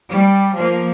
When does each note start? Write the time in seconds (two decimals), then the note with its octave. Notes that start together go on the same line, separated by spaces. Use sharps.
0.11 G3
0.55 F3 A#3